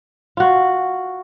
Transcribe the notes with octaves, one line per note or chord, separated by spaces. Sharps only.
F4 F#4